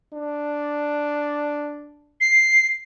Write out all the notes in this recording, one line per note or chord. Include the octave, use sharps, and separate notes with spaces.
D4
C7